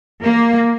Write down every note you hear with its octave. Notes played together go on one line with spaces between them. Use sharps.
A#3